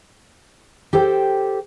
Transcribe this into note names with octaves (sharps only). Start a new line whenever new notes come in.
G4 A4 C5 G5